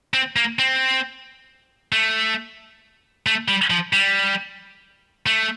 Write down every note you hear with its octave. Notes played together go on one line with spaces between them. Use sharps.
C4
A#3
C4
A3
A3
G3
F3
G3
A3